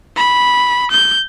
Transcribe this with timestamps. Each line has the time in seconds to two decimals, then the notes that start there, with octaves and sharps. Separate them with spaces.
0.16 B5
0.91 G6